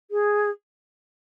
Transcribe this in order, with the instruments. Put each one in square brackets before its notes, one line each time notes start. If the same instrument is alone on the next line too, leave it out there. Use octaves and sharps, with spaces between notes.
[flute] G#4